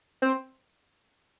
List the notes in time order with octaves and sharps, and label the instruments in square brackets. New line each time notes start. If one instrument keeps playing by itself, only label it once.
[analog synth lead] C4